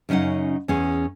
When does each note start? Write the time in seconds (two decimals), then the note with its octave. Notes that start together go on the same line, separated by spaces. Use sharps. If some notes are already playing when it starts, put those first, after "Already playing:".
0.09 F#2 C#3 C#4 D#4 F#5
0.68 E2 C#4 G#4